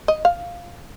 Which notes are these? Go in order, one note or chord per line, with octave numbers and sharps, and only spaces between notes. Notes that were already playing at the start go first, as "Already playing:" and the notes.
D#5
F5